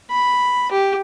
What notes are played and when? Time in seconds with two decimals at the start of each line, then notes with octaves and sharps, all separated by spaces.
0.11 B5
0.72 G4